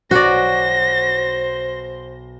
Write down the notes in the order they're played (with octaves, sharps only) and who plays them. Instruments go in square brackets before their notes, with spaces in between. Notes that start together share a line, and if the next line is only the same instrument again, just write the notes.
[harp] B1 F#5 [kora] F#4 D5 [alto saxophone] C5 [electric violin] A#6